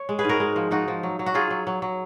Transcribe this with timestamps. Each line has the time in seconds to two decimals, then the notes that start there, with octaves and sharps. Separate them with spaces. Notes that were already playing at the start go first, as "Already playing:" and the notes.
Already playing: C#5
0.09 G#3
0.19 G#4 B4
0.24 G#2 F#4 A#4
0.40 G#3
0.56 F3
0.71 F3 D#4 F#4
0.88 F3
1.03 F#3
1.19 F#3
1.26 F#4
1.34 F#3 F4 G#4
1.51 F#3
1.67 F#3
1.82 F#3